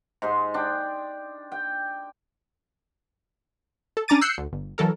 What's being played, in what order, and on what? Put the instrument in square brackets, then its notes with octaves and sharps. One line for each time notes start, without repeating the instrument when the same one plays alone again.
[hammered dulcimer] G#2 G#3 C6
D4 G5
G5
[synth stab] A4
C#4 D4 A#5 D6 A6 D#7
E6 F#6 G6 C7 C#7
D2
G1
E3 F#3 A4 A#4